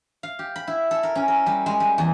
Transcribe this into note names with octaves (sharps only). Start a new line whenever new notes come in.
F5
G4
B5
E4
A4
A#4
C#4
A#4
G3
G#3
G3
E2